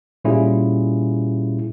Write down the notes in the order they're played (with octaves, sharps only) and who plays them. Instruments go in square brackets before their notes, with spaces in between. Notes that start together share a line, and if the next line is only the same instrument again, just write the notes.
[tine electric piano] A#2 G3 C#4 E4 F4 G#4